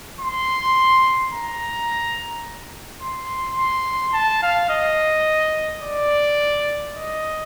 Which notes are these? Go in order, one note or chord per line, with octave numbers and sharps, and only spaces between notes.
C6
A#5
C6
C6
A5
F5
D#5
D5
D#5